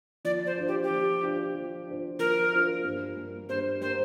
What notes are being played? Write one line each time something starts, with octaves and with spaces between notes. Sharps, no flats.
F3 D5
C5
D4 F4 C5
G4
G4
F3
D4 F4 C5
F3
D4 F4 C5
F3 A#4
D4 F4 C5
G2
G3 A#3
G2 C5
G3 A#3 C5